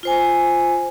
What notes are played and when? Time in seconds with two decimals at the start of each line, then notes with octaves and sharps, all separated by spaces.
0.03 F4 C5 G#5